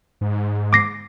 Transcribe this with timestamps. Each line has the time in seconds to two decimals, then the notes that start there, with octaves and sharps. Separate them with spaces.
0.21 G#2
0.73 D6 A#6 C7